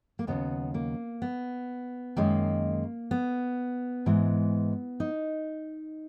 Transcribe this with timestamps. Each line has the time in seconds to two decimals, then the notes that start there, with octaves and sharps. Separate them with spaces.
0.19 A#3
0.27 D#2 C#3 F#3 B3
0.74 A#3
1.22 B3
2.17 F#2 D#3 G#3 A#3
3.11 B3
4.06 G#2 E3 G#3
5.00 D#4